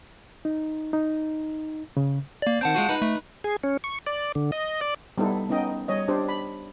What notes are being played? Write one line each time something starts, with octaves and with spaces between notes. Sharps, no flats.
D#4
D#4
C#3
A#3 D5
D#3 C4 F#5 A5 G6
G#3 F4 F#4
D#4 B4
A3
G#4
C#4
C#6
D5
D3
D#5
D5
G3 B3 D#4 E4 A4
B3 C#4 D#4 D#5 G5
G3 C#5 D#5
D4 G4 C5
B5